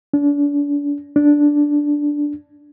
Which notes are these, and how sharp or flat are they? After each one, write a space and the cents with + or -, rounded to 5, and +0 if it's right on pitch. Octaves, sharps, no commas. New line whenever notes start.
D4 -35
D4 -5